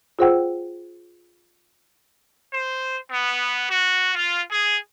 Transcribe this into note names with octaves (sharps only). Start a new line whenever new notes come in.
F4 G#4 C5 F#5 G5 E6
C5
B3
F#4
F4
G#4